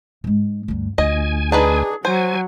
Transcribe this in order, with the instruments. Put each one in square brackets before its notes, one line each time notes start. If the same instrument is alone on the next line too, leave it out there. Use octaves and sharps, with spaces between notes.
[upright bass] G#2 G#3
D2 G2
[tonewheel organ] D2 G#5 [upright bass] F4 [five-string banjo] D#5
[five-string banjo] D4 D#4 B4 [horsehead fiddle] G#4
[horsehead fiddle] F#3 [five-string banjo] C5 [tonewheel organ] G#5